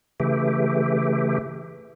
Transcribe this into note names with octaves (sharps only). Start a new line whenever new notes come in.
C#3 E3 A3 G4